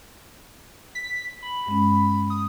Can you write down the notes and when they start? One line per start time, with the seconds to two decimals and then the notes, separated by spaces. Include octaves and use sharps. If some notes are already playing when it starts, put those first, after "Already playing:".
0.95 B6
1.42 B5
1.66 G2 G#3 C#4
2.30 D#6